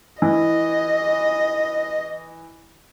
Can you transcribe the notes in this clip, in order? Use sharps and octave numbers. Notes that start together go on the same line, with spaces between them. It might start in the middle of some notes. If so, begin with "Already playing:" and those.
E3 D#5